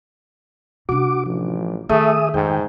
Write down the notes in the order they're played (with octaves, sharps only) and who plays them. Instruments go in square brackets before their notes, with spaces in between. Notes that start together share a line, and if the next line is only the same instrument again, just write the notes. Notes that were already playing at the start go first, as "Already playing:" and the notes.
[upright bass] C3 D4 [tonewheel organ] F#4 D6
[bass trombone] A1 [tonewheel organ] F3
[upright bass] D#3 [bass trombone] A3 [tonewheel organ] G#4 E5 D#6
[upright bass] F2 [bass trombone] G#2 [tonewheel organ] D#3 G5